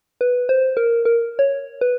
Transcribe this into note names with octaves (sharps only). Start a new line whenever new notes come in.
B4
C5
A#4
A#4
C#5
B4